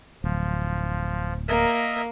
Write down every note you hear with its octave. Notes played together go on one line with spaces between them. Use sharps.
D1 F3
A#3 A#4 D#5 E5